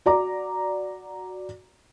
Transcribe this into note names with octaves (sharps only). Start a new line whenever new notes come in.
F#4 D5 A#5 D6